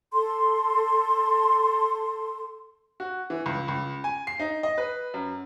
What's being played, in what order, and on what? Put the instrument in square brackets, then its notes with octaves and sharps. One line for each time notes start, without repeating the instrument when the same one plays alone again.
[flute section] A4 C6
[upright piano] F#4
E3
C#2
C#2
G#5
C7
D#4
D#5
B4
F#2